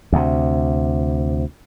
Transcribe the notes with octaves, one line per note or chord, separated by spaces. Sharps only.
D2 C3